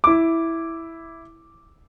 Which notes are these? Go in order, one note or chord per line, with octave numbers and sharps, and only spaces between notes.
E4 D6